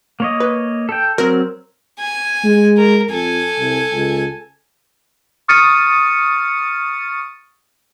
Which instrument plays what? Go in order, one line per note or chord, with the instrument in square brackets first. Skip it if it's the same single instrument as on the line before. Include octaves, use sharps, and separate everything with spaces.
[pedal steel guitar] A#3 C#5 D#5
[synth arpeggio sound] B4
[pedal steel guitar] A4 G5
[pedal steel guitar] F#3 C4 [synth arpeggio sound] A#4
[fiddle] G#5
[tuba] G#3
[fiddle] A#4
[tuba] F2 [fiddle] A4 G#5
[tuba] C2
C#2
[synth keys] C#6 D#6 F6 A6 C#7 D#7